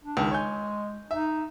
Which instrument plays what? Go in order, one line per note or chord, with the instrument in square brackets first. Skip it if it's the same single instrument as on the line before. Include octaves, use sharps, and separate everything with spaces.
[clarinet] D4
[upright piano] C#2 D#3
[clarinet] G#3 [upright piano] C#5 G#5 G6
[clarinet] D#4 [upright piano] E5